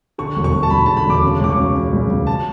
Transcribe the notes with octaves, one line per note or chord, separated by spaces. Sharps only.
D3 C#6
E1
C#6
E1
A5
E1 B5
D3 A5
B5
E1 D6
C#3
C#2 D6
C#6
C#3
C#3
C#2
C#2
A5